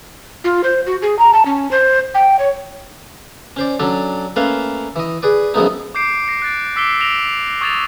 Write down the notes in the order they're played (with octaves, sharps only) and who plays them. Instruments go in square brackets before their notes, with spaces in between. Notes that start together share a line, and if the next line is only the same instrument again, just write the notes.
[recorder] F4
C5
F#4
G#4
A#5
A5
C#4
C5
G5
C#5
[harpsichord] C#4 C5 D5
F#3 C#4 D4 A4
A3 A#3 C#4 B4 F5 A5
E3 D#5
G#4 B4 D5
F#2 F3 G#3 A3 B3 D#4
[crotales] D6 G6 C7 D7
A#6 C7 C#7
F#6 A6 D7
D6 E6 B6 C7 D7 G7
A#6 D7 E7 F7 G7
C#6 D#6 G#6 A6 E7 F7